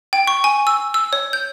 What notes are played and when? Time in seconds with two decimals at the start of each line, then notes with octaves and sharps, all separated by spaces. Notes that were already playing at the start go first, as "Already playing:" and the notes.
0.13 G5
0.27 C#6
0.44 G#5
0.67 E6
0.94 E6
1.13 C#5
1.33 G6